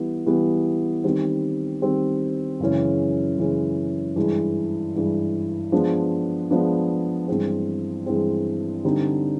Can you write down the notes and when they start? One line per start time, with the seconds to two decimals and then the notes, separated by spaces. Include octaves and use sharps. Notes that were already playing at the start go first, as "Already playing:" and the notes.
Already playing: E3 G3 B3
0.26 E3 G3 B3
1.04 D#3 G3 C4
1.82 D#3 G3 C4
2.60 F#2 C#3 E3 G#3 C#4
3.38 F#2 C#3 E3 G#3 C#4
4.16 G2 E3 G#3
4.95 G2 E3 G#3
5.72 F3 G#3 B3 D4
6.50 F3 G#3 B3 D4
7.28 G2 E3 G#3 C4
8.06 G2 E3 G#3 C4
8.84 D3 G3 C4 D#4